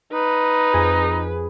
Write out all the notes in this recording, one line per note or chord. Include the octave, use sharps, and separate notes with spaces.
D#4 B4
F2 G#4